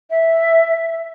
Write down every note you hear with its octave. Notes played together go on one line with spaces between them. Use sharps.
E5